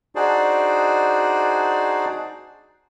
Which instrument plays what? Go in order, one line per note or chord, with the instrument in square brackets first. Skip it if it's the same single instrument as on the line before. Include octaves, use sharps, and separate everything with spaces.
[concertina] D4 D#4 F#4 G#4 C5 D5